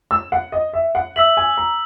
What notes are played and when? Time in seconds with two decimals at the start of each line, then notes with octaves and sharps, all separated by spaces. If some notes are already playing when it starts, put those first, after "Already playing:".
0.11 E6
0.32 F#5
0.52 D#5
0.73 E5
0.95 F#5
1.16 E5 E6 B6 F#7
1.37 G#5
1.57 A#5